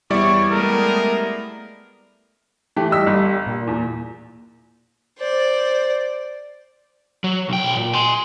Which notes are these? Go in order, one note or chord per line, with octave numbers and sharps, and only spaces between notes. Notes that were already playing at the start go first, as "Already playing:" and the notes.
E2 G3 E4 C#5 D5 C#6
G#3 A3 B3 A#4
E3 A3 G4
G3 D#5 E6 B6
G1
A#2
E2
C5 D5
F#3
B1 G5
A#2
G#5 C6